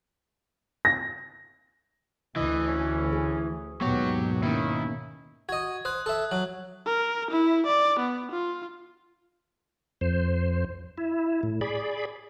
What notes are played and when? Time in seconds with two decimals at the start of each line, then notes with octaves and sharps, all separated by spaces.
0.85 A#6
2.36 D2 E3 D#5
2.67 C#4
3.13 G#4
3.81 D#2 G#2 B2 F#3 B3 G4 C#5
4.43 D#3 A#3 C#4 E4
5.49 F#4 D#5 G#6
5.85 C5 D#6 F#6 G#6
6.06 A4 E5
6.31 F#3 F#6 F#7
6.86 A#4
7.31 E4
7.66 D5
7.99 B3
8.31 F4
10.01 F2 C5
10.98 E4
11.43 A2
11.61 G#4 D5 B5